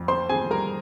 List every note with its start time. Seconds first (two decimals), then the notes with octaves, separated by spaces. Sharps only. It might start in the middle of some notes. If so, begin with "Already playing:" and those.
Already playing: F2
0.08 C4 C5 C6
0.29 C4 G#4 G#5
0.50 G3 A#4 A#5